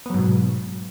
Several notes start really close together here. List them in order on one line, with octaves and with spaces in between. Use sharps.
B3 F#3 G#2 B2